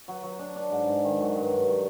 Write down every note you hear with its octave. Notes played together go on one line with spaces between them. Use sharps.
F#3
F#3
D4
D4
G#2
G#2
D#3
F#3
G2
G2
F#3